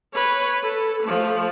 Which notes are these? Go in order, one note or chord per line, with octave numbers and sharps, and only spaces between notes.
B4 C#5
A4
F3 A3